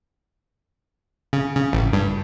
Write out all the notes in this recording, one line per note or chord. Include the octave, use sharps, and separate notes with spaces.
C#3
C#3
A1
G2